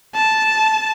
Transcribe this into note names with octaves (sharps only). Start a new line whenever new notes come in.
A5